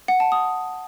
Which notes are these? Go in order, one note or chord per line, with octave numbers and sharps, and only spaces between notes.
F#5
A5
D#6